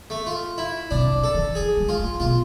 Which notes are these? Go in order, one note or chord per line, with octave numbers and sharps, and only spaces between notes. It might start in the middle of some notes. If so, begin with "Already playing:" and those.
A3
F4
E4
C3 D4
C3
A4
E3
F3 G#4
G#3
F4
A3
B2 F4